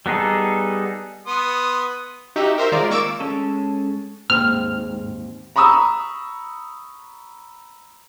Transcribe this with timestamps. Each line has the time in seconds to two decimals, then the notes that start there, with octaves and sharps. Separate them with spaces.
0.06 G3 B3 D#4 G#4 A4
1.27 B3 C6 D#6
2.36 D#4 F#4 G4 E5
2.58 A#4 C5 E5
2.72 D#3 G#3 F4 A#4 D5
2.90 A#3 C#6 D6 E6 D7 E7
3.20 G#3 C#4 A4
4.30 D#2 G#2 C4 F6
5.56 A#5 B5 C#6 D#6 E6